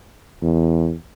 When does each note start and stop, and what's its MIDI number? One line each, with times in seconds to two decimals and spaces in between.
0.42 0.94 40